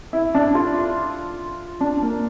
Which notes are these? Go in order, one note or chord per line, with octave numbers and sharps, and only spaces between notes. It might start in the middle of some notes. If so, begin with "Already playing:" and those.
E4
D4
F4
D4
A#3